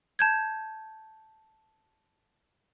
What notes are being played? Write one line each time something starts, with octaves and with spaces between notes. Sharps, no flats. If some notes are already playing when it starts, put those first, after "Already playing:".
A5 G6 G#6